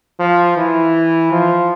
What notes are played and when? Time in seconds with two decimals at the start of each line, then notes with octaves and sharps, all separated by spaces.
0.19 F3
0.57 E3
1.32 F3